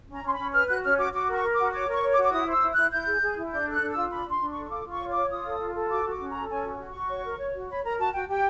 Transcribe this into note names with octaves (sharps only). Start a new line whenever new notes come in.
C#4 A#5
C#4 C6
B5
C#4
B4 F6
F#4 F#6
C#4 F6
F#4 D6
F#4 D6
A#4 C#6
A#4
F#4 D6
C#5 D6
A#4 C#6
C#5
D6
F#4
D6
E4 D#6
C5 E6
E4
E4 F#6
E4 G6
G#4
G#4
E4
D4 G6
A4
F#6
D4
F4 E6
D4 B5
D4 C6
D4
A4 C#6
C#6
F4 D6
F4
C#6
C#5
C#5 D6
F4 D#6
A4
F4
A4
F#4 D6
F#4
D6
C#4
A4 A#5
C#4 G#5
F#4
F#4
C#6
F#4
C#5
A#4
C#5
F#4
C#5 B5
A#4 A#5
F#4 A5
F#4 G5
G4 G5